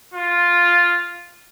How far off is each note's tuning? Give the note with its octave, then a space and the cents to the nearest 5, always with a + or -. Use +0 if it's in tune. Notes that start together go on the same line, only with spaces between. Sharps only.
F4 +0